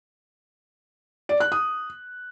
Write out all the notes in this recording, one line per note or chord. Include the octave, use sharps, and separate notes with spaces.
D5
F#6
D#6